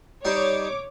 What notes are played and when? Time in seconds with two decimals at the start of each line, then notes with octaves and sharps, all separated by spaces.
0.25 G3 D#4 C5 C#5 D6